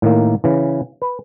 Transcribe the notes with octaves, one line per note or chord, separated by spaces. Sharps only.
A2 D#3 A#3
C#3 E3
B4